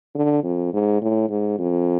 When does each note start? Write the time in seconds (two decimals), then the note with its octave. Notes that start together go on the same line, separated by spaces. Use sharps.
0.15 D3
0.44 F2
0.73 G#2
1.02 A2
1.29 G#2
1.59 F2